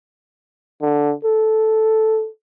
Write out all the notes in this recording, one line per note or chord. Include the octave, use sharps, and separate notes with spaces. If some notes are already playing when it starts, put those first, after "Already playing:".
D3
A4